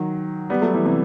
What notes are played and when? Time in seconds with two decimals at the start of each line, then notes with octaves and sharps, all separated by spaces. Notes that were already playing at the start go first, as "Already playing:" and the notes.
Already playing: D#3 F#3
0.50 G3 B3
0.62 F#3 A3
0.74 E3 G3
0.86 C3 E3